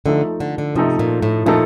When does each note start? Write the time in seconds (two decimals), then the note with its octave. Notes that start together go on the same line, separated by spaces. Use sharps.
0.06 D3 F3 A3 D#4 A4
0.40 D3
0.58 D3
0.75 C3 F3 A3 D#4 A4
0.99 A#2
1.22 A2
1.46 A#2 F3 A3 D#4 A4